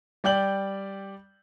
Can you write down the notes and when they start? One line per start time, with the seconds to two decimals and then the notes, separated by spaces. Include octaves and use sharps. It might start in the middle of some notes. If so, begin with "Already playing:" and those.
0.24 G3 D5 G5 G6 F#7